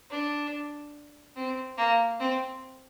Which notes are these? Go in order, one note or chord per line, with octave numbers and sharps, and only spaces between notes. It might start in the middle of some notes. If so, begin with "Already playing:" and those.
D4
C4
A#3
C4